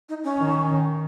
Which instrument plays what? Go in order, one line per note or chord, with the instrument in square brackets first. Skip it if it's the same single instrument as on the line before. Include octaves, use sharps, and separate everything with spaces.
[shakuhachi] D#4
C#4
[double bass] D#3